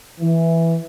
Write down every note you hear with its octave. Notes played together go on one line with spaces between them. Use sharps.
E3